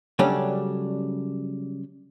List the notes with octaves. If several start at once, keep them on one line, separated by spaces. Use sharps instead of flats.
C#3 F#3 G3 A3 C#4 D4